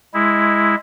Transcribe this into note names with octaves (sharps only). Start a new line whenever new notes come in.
G#3 E4